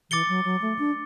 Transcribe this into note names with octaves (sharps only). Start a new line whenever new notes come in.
E3 D6 A6 C#7 G7
F#3
F#3
A3
D4